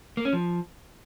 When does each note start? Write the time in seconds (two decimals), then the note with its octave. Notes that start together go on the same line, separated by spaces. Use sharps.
0.17 A#3
0.25 C#4
0.33 F3